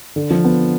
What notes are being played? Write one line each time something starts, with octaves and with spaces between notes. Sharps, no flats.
D3
F3
B3